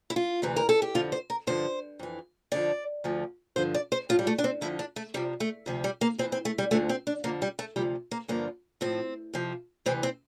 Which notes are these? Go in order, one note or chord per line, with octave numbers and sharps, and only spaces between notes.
E4
F4
D2 C3 E3
A#4
A4
G4
F2 D3 F3 F4
C5
A#4
G2 D3 F3 C5
F2 E3
F2 D3 F3 D5
D2 D3 F3
G2 D3 F3 C5
D5
C5
A2 F3 F4
G3
A3
D4
C4
F2 D3 F3 E4
D4
A3
D2 C3 F3 G3
A3
D2 C3 F3
G3
A#3
F2 E3 C4
C4
A3
G3
D2 D3 F3 A3
C4
D4
F2 D3 F3 A#3
G3
A3
D2 C3 F3 G3
A#3
G2 D3 F3 A#3
A2 F3 C4
F2 C3 F3
D2 C3 E3 C4
C4